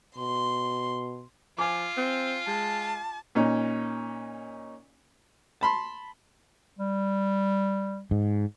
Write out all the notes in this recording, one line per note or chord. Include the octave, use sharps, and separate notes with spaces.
B2 C6
F3 F4 G#5 D6
C4
G#3 A5
A#2 C#4 D#4
A5 B5 C6
G3
G#2